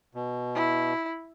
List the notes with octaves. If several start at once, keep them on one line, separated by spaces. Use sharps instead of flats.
B2
E4